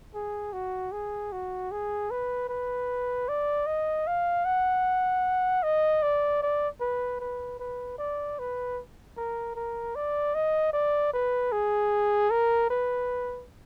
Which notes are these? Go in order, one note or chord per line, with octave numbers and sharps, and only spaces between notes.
G#4
F#4
G#4
F#4
G#4
B4
B4
D5
D#5
F5
F#5
D#5
D5
D5
B4
B4
B4
D5
B4
A#4
A#4
D5
D#5
D5
B4
G#4
A#4
B4